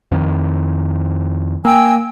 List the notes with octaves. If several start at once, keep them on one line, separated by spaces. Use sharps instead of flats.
F2 D#3
A#3 G5 G#5 E6